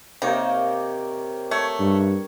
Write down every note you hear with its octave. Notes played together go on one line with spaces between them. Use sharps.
C3 A#3 D#4 C#5
A3 C#5
G2